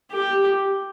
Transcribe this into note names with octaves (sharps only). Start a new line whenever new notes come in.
G4